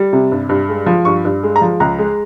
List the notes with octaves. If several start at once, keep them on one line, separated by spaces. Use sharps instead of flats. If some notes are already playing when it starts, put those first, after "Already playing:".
Already playing: G3
C3
G2
G2
G#3
F3
G2 C#6
G2
G#3
A#5
F3
C#2 A#5
G#3